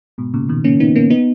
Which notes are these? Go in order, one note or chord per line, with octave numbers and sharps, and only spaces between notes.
G#2 B2
A#2 C#3
B2 D#3
A#3 C#4
B3 D#4
A#3 C#4
B3 D#4